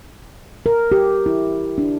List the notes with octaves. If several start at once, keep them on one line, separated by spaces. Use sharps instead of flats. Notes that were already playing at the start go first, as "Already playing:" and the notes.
A#4
G4
E4
D4